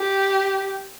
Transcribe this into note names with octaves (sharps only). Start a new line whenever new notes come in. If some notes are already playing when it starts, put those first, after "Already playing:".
Already playing: G4